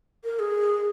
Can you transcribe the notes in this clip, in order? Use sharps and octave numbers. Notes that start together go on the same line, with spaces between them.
A#4
G#4